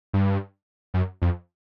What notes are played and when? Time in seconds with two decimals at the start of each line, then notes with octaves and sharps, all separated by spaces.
0.13 G2
0.94 F#2
1.22 F2